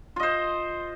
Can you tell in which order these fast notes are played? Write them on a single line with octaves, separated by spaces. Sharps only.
F4 D#5 C5